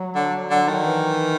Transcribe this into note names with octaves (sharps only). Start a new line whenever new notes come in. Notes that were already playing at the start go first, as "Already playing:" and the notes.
Already playing: F#3
D3
D3
D#3
E3